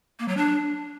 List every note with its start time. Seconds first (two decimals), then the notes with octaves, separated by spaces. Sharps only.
0.19 A#3
0.28 F#3
0.37 D4